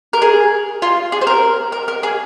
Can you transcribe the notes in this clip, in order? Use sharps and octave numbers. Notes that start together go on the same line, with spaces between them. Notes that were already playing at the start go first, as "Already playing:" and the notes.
A#4
G#4
F4
G#4
C5
A#4
A#4
A#4
G#4